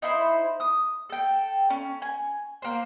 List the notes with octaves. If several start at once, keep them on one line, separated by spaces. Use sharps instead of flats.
D#4 E4 C5
D#6
A4 G5
C#4
G#5
A#3 C5